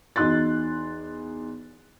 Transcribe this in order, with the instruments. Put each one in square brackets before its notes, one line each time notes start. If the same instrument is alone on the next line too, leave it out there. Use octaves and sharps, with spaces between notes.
[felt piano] E2 D#4 F#4 C6 F#6 A6